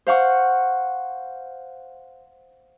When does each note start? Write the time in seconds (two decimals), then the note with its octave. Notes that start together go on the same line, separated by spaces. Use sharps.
0.07 C5 F5 F#5 C#6